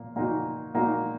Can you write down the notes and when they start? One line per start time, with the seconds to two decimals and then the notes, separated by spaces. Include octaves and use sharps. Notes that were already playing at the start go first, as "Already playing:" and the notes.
Already playing: A#2 A#3
0.16 A#2 A#3 D#4 F#4
0.74 A#2 A#3 D#4 F#4